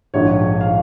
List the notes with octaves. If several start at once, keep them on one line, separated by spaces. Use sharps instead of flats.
A#1 G#2 F3 C#5
F5